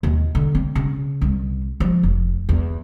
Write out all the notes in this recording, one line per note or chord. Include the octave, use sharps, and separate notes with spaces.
D#2
D3
C4
C#3
C2
F3
F1
E2